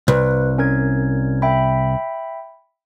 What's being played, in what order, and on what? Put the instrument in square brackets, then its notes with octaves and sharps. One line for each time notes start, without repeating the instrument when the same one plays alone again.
[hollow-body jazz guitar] C2 [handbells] B4
[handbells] C#4 A#4 G#6
E5 G5 B5